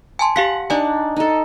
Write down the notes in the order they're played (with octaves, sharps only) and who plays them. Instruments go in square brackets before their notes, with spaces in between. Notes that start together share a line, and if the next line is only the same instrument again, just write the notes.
[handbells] G#5 A5 C6
[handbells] G4 F5 B6 [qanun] F#5
[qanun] D4 D#4 [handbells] D5 G#5
[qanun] D#4 A4